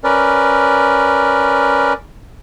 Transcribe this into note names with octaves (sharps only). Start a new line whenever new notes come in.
C#4 A#4 B4 D5